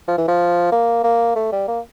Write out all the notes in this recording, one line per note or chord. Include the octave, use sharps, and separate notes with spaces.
F3
E3
F3
A#3
A#3
A3
G3
A#3